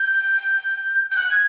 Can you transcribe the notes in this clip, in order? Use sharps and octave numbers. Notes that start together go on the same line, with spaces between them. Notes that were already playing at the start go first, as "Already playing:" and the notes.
Already playing: G6
G6
F#6
G#6